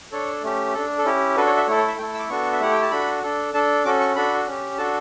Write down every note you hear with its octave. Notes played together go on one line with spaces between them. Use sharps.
D4 A4 C#5
A3 C#4 G4
D4 A4
A4
C#4 E4 G4
D4 F#4 A4 B4
C#5
E5
A3 E4 A4 C#5
C#5
E5
A3 E4 A4 G5
E6
D6
B3 D4 F#4 A4 C#6
E5
A3 E4 G4 F#5
G5
A5
D4 F#4 A4 B5
D4 A4
D4 A4 A5
C#4 F#4 A4 D6
C#6
D4 F#4 A4 B5
C#4 G4
D4 F#4 A4 A5